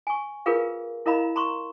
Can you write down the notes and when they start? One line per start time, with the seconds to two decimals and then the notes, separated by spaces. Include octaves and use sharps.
0.07 G#5 C#6
0.46 F4 G#4 A#4 B4 F5
1.06 E4 A#4 D#5 F5 A#5 B5
1.36 A#5 C6 C#6